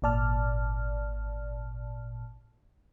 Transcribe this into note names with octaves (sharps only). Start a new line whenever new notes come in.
G#1 A#2 D5 A5 F6